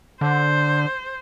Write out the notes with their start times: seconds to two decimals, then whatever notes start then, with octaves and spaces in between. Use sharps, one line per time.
0.21 D3 C5